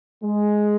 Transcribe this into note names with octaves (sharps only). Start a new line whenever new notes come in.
G#3